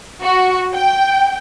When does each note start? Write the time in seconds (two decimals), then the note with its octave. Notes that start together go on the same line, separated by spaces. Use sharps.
0.23 F#4
0.73 G5